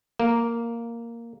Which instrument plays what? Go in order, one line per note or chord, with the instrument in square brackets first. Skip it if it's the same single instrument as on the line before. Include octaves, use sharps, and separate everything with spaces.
[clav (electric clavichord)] A#3